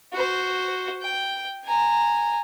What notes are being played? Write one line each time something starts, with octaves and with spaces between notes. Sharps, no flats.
F#4 C5
G5
G#5 A#5